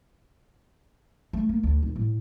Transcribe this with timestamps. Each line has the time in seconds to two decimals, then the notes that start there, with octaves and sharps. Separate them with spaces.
1.33 A3
1.49 A#3
1.63 D2
1.83 D#1
1.96 A2